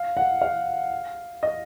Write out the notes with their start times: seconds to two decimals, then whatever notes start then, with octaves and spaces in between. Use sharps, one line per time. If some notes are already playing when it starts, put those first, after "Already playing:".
Already playing: F5
0.17 F#5
0.41 F5
1.43 D#5